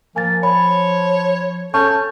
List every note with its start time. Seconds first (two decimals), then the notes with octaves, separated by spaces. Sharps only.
0.16 F3 A#3 G#5 A6
0.43 C#5 B5
1.74 C#4 A4 A5 C#6 G6